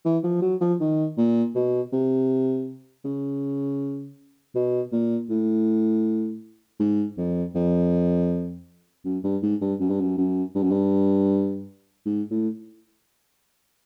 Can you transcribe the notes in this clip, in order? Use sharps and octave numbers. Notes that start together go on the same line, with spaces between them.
E3
F3
F#3
F3
D#3
A#2
B2
C3
C#3
B2
A#2
A2
G#2
F2
F2
F#2
G2
G#2
G2
F#2
G2
F#2
F#2
G2
F#2
G2
G#2
A2